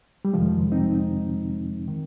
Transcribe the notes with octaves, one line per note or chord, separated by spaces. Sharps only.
G3
F2 C3 D#3 F3 G#3
C4 D#4
D#3